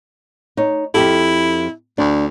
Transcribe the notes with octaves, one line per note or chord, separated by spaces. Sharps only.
D#4 C#5
F2 E4 G4 A4
D2 D4